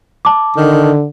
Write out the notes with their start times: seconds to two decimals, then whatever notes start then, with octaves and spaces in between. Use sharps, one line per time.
0.25 A5 D6
0.56 D3 D#3